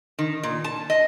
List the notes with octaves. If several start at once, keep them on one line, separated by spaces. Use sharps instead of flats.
D#3
A#2
A5
D#5